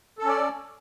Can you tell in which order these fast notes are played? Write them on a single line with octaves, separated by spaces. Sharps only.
A4 C#4 D5